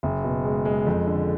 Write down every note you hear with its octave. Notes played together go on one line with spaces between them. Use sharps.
F#1
B2
G#3
G#3
F2
D3